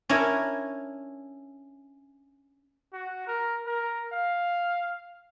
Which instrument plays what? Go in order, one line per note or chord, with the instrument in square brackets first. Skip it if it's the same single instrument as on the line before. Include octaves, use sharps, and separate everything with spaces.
[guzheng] C#4 D4 E4 A#4 C#5
[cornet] F#4
A#4
A#4
F5